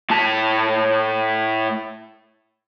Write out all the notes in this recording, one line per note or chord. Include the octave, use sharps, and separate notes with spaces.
A2 A5